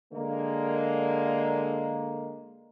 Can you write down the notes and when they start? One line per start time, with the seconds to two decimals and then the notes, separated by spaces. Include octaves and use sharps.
0.13 D3 G#3 A#3